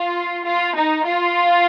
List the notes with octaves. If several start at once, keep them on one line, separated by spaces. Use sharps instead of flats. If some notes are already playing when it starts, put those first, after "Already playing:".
Already playing: F4
F4
D#4
F4